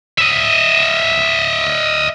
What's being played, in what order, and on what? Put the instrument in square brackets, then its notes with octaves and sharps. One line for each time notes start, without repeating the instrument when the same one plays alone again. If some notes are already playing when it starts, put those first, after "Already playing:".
[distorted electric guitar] D#5 E5